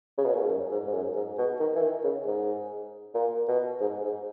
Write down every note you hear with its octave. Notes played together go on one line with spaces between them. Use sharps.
C#3
B2
A#2
G#2
F#2
G#2
G#2
F#2
G#2
B2
D#3
E3
D#3
C#3
G#2
A#2
B2
G#2
G#2